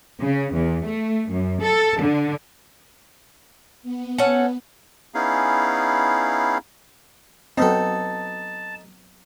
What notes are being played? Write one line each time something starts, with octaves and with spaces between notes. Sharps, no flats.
C#3
E2
A3
F#2
A4
D3
B3
C#4 A4 F#5
B3 C#4 D#4 E4 G#4 F5
F#3 B3 C4 D#4 A4 A5